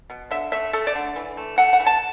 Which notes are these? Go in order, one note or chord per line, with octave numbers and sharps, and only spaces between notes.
B2
D3 E5
A3 E5
A3 A4
D5
D3
E3
A3
A3 F#5
F#5
E3
A5